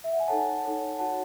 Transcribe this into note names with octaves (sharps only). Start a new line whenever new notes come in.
E5
F#5
G#5
D#4 A4 C#5 F#5 A5
D#4 A4 C#5
D#4 F#4 C#5 F#5 A5